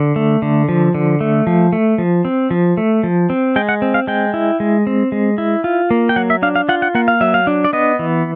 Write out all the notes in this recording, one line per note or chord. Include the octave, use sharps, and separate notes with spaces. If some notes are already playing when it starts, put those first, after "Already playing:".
Already playing: D3
A3
D3
F3
D3
A3
F3
A3
F3
C4
F3
A3
F3
C4
G#3 G5
F#5
C4
F5
G#3 G5
E4
G#3
C4
G#3
E4
F4
A#3
G5
F#3 F#5
E5
D4 F5
F5
F4 F#5
F#5
A#3 F#5
F5
F#3 E5
F5
D4
D5
B3 D#5
E3